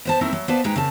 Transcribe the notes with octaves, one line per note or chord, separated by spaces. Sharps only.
B3 C5 A5
A3 C4 D#4 E4 A#4
F#3
B3 B4 C5 D5 F5 A5
G#2 G#3 D#4 B4 G5 A#5
C#3 C4 A#4 A5